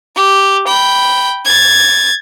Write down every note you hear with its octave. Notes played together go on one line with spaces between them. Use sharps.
G4
G5 B5
G#6 A6